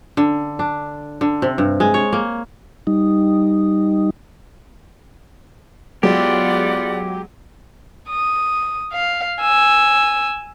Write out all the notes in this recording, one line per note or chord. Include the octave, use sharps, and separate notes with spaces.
D3
D4
D3
C3
G2
G#3
C#5
A#3
G3 D#4
F#3 G#3 B3 F4 G4 D5 F#5
D#6
F5
G#5 E6